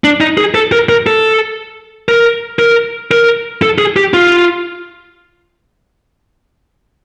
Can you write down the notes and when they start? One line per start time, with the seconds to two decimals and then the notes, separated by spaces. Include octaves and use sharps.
0.04 D4
0.21 D#4
0.38 G#4
0.55 A4
0.72 A#4
0.89 A#4
1.07 A4
2.08 A#4
2.59 A#4
3.11 A#4
3.62 A4
3.78 G#4
3.96 G4
4.14 F4